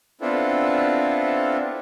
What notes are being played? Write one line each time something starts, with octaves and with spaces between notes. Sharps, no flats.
B3 C4 D4 E4 F4 A4